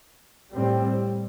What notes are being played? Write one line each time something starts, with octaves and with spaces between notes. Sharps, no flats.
A2 G3 C4